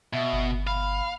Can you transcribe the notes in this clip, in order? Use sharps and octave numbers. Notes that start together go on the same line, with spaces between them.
B2 E5
G1
F5 B5